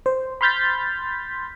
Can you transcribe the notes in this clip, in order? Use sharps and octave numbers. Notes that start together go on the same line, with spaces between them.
C5
B5 C6 F6 G6 A6 B6